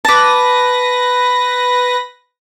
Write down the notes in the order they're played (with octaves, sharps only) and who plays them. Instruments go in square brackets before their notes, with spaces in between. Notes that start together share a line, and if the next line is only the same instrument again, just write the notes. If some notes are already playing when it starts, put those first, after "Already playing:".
[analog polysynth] B4 A#6 [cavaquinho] A5 D6